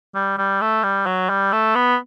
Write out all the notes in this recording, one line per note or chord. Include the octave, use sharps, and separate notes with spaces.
G3
G3
A3
G3
F#3
G3
A3
B3